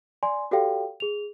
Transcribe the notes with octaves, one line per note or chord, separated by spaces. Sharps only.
D5 G#5 C6
F#4 G4 A4 D5 F5 G5
G#4 F7